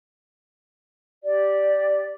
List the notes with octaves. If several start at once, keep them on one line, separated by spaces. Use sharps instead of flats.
G4 D5